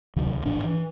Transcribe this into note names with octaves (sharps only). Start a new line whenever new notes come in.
D2 C3 D#3 F#3
C#2
A1 G#2 D#3 D4
E3